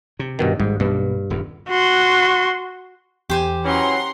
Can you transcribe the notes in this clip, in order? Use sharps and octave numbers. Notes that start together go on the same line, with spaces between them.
C3
G2 B2 D#3
G#1 G#2 G3
B1 G2 B2 A#3
D#1 E2
F#4 C6
E2 G4 C5 G#5
E3 F#3 C#4 F#5 A#5 C6